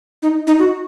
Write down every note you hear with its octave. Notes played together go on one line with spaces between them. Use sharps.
D#4
D#4
F#4